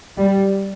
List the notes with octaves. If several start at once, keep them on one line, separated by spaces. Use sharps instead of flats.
G3